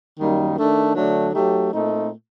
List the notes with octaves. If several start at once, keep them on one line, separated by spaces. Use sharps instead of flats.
F#2 D#3 G3 A#3 D#4
D#3 A3 D4
D3 F#3 A3 D4
F#3 A3 D#4 G4
A#2 A3 C4 D#4